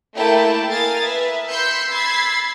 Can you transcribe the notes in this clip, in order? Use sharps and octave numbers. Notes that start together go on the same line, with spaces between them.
A3 A#3 E4 G5 A5
A#4 F5 G#5 D#6 A6
B4 E5
B5 C6 E6 G6 B6 C#7
B5 E6 G#6 A6 C7